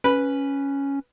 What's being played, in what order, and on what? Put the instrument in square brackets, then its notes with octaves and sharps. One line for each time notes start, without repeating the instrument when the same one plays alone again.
[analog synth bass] C#4 [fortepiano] B4